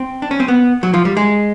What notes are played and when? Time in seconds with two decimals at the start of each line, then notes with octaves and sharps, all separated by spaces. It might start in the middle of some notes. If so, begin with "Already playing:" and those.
Already playing: C4
0.22 D4
0.31 C#4
0.40 C4
0.48 B3
0.83 F#3
0.94 F3
1.05 G3
1.17 G#3